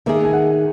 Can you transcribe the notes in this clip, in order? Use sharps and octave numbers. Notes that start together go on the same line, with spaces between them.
D#3 A#3 D#4 G#4 E5
G#5
F#5